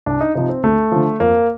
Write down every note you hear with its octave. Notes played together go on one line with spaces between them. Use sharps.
C2 D4
D#4
C3 F3 D#4
C4
D2 A3
D3 F3
F2 A#3